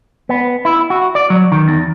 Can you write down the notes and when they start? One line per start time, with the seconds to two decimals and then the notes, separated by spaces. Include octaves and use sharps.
0.29 B3
0.65 E4
0.90 F#4
1.15 D5
1.30 F#3
1.52 D#3
1.68 E2